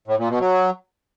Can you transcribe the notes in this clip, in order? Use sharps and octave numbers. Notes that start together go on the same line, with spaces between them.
A2
A#2
B2
F#3